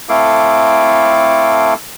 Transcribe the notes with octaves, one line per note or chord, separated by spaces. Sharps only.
A3 C4 E4 A4 F5 D6